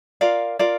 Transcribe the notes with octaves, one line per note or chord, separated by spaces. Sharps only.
F4 A#4 D5 F5
F4 A#4 D5 F5